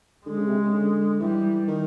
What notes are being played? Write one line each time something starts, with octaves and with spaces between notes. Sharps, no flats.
D3 G#3
C#3
C3
C#3
D3
E3 G3
D#3